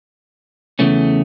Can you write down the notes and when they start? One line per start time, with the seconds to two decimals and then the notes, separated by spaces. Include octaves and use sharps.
0.79 E2 C#3 E3 A3 C#4